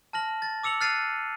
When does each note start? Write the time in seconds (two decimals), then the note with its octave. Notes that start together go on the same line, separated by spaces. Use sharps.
0.13 A5 F6 A#6 F#7
0.42 A6
0.63 D6 E6 C#7 F7 F#7
0.81 F6 F#6 A6 C7 D#7 F7